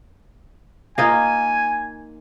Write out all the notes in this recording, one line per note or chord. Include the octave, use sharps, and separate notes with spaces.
A#3 D#4 F4 G#5